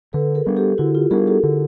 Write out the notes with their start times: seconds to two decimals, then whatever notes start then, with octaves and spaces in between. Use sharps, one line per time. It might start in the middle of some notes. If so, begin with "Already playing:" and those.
0.13 D3 A4 B4
0.35 G#4 A#4
0.46 G3 B3 D4
0.57 G4 A4
0.78 D3 E4 F#4
0.95 F4 G4
1.11 G3 B3 D4 G#4 A#4
1.27 G4 A4
1.43 D3